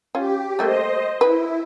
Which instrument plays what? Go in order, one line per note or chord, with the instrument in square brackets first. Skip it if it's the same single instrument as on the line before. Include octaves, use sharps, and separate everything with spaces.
[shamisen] C#4 F4 [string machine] G4
[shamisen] G3 A3 A#3 [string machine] C5 D#5
[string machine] E4 [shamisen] B4